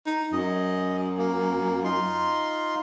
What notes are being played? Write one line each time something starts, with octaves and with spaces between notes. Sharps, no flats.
D#4
F#2 D#5
A#3
D#4 F4 C6